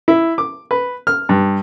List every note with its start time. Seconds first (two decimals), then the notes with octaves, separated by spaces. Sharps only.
0.08 E4
0.38 D6
0.71 B4
1.07 F6
1.29 G2